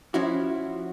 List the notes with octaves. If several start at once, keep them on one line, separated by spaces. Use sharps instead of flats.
F3 C#4 E4 F#4